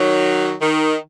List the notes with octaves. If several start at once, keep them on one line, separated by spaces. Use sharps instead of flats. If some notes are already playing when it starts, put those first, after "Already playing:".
Already playing: D#3 F#3
D#3